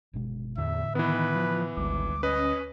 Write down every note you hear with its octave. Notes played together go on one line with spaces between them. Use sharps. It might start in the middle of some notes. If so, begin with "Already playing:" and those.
G1 B2 G#3
E2 A2 D3 E5
D#3 E3 B3 B4
F3
G#1 D2 G3 G#3 D6
C#4 B4 D#5